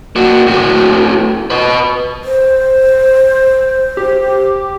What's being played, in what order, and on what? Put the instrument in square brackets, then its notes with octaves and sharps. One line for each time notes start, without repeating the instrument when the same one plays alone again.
[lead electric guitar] A#3 F#4
A2 F#4
B4 D#5
[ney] C5
[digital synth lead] G4